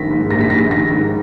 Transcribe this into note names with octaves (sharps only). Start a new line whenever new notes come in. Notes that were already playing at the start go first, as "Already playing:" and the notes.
Already playing: A#1 D#3 A#6 B6
G#2
A#1 A#6
B6
A#1 A#6
D#3 A#6
G#2